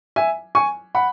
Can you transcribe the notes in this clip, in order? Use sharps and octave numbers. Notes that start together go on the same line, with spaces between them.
E5 G#5
G#5 C#6
F#5 B5